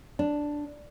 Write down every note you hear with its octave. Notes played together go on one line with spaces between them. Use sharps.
D4